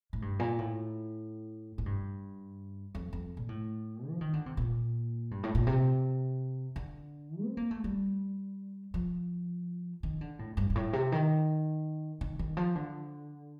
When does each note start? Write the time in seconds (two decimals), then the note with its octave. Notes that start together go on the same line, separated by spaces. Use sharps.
0.13 A2
0.22 G2
0.39 A#2
0.58 A2
1.78 A2
1.86 G2
2.95 F2
3.13 F2
3.37 A#2
3.49 A2
4.10 F3
4.21 D#3
4.33 D3
4.46 C3
4.57 A#2
5.31 G2
5.43 A2
5.55 A#2
5.67 C3
6.76 D3
7.43 C4
7.57 A#3
7.71 A3
7.84 G3
8.94 F3
10.03 D#3
10.21 D3
10.39 A2
10.57 G2
10.70 G2
10.75 A2
10.93 C3
11.12 D#3
12.21 D#3
12.39 D#3
12.57 F3
12.75 D3